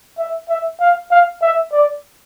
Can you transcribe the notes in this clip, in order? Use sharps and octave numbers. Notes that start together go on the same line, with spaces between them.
E5
E5
F5
F5
E5
D5